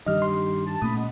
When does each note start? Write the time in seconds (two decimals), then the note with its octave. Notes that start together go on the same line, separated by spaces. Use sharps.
0.06 G2 D#3 G3 D#4 G4 D#5 F6
0.22 C6
0.67 A5
0.82 A#2 A3 A#3 C#4 B5 D#6
0.94 G#3 B3